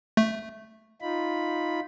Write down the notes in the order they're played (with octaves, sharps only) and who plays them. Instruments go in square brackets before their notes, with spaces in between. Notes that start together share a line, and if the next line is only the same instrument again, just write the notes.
[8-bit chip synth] A3
[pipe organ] D#4 F4 B5